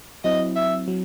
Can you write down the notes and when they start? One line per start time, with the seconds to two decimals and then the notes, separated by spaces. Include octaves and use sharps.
0.24 F#3 C4 E4 D#5
0.56 E5
0.88 F#3